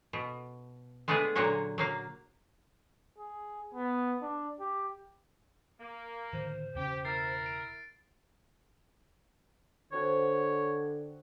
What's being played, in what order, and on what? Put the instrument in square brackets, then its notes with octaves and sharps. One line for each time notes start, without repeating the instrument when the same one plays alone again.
[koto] B2
G#3 A3 B3 D4 G#4 B4
A#2 D3 F#3 A#3 F#4 C#5
F#3 A#3 F5
[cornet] G#4
B3
D4
G4
[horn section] A#3
[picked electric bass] A2 D3 D#3 [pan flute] C5
[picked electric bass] E1 C#3 C#4 [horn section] G4
[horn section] E4 A#4 [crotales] A6 C7
[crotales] D7
[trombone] D3 [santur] C4 F#4 A5 [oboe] C#5